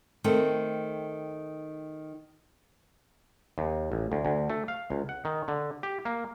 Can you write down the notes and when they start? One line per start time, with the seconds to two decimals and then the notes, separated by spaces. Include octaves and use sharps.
0.24 D#3 A3 C4
3.58 D#2
3.92 A1
4.12 D2
4.25 D2
4.50 A3
4.68 F5
4.90 C#2
5.09 F#5
5.25 D#3
5.48 D3
5.83 G4
6.05 A#3